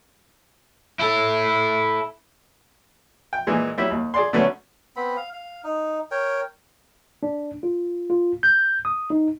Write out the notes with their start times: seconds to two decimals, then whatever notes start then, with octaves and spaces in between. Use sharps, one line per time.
0.99 E4 A4
3.33 G5
3.47 A#2 E3 G#3
3.77 F#3 G3 E4
3.90 D#2
4.14 G#4 D5 C6
4.33 D3 F#3 A3 B3 C#4
4.96 B3 C4 B5
5.17 F5
5.33 F5
5.64 D#4
6.11 A#4 C#5 G5
7.23 D4
7.63 F4
8.10 F4
8.43 G6
8.85 D#6
9.10 D#4